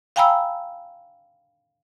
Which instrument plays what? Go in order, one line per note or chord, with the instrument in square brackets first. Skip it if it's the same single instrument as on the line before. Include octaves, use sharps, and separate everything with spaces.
[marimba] F5 G5 G#5 A#5 B5 E6